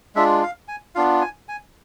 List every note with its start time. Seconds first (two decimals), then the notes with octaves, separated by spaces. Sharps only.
0.15 G#3 D4 F4 E5
0.43 F5
0.68 G#5
0.95 B3 D4 F4 F5
1.21 G#5
1.49 G#5